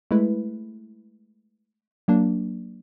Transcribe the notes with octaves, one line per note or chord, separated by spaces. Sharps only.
G#3 A3 E4 B4
F#3 A#3 D4